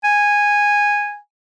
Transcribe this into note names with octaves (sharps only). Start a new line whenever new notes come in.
G#5